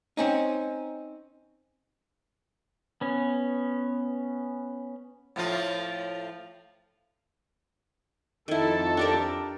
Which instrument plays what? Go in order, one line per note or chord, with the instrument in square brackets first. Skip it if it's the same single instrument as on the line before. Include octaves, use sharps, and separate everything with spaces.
[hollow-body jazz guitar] C4 C#4 D#4
[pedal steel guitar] B3 C#4
[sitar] A2 F3 F4
[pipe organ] F2 A4 [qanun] D#3 E4
[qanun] D4 G4 A#4